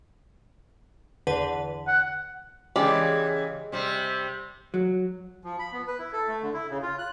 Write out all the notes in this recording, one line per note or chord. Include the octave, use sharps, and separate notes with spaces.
E2 D3 B4
F#5
C#3 E3 G#3 G4 D5
C3 G3 C4
F#3
F3
B5
B3
B4
E4
A4
A3
D3
E4
C#3
F4
F#6